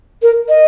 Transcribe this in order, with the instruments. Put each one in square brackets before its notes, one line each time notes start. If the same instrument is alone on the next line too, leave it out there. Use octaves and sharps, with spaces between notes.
[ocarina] A#4
D#5